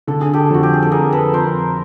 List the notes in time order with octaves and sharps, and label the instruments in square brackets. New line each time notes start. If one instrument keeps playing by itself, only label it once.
[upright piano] D3 [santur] A4
[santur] G#4
G4 A4
[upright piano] F2 [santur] F#4
[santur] G4
G#4
A4
[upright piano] F2 [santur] G#4 A#4
[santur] A4 B4
[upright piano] F2 [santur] A#4 C5